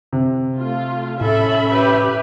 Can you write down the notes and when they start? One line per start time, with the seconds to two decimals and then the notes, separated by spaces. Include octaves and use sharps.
0.13 C3
0.60 A3 F4
1.21 A2 C#4 A4 E5 B5
1.72 G4 B4